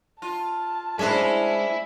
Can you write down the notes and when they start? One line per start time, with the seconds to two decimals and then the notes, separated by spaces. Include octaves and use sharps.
0.22 F4 A5
0.99 G#3 C#4 D4 C5 E5 B5